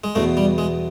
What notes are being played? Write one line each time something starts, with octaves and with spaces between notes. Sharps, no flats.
G#3
E2 B2 A3
G3
G#3